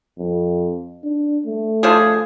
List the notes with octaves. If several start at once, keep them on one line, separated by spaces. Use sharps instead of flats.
F2
D4
A3
D3 F3 G#4